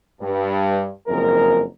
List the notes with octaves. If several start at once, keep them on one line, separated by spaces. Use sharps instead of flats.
G2
F#1 F2 G#3 A#4